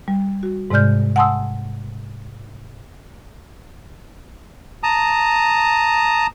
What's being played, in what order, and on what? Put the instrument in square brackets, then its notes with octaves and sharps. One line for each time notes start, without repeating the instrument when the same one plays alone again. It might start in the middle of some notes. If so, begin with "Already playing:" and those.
[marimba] G3
F#4
G#2 C3 G#3 D5 F6 G6
F#5 G#5 A5 C6 D#6 E6
[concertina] A5 A#5 D#6